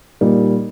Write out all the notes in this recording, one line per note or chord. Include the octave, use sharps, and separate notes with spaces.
A#2 G3 A#3 D#4